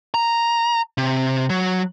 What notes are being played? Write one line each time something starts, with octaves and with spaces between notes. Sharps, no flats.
A#5
C3
F#3